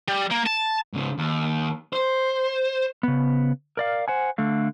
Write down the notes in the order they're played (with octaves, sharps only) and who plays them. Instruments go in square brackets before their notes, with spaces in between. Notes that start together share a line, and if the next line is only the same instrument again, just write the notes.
[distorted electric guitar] G3
A#3
A5
[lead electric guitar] G#2 C#3
D#2
C5
[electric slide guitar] C#3 B3
A#4 D5 F5
C5 F#5 G#5
D3 A3 F5